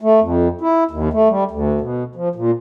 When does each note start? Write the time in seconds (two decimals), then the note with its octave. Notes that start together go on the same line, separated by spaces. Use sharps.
0.01 A3
0.21 F2
0.61 E4
0.91 D#2
1.13 A3
1.29 G3
1.51 D2
1.81 B2
2.15 F3
2.35 A#2